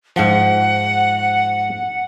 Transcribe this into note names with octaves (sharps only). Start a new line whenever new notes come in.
G#2 F3 F#5